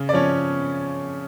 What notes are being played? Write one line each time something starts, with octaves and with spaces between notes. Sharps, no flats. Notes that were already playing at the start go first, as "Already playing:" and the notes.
Already playing: C#3
D5
F3 C#4 C#5